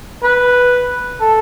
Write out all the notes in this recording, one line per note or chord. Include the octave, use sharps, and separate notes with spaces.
B4
A4